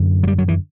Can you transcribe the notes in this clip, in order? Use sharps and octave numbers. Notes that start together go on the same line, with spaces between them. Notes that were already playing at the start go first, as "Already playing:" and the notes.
Already playing: F#2 D3
F#3
G3
F#3
E3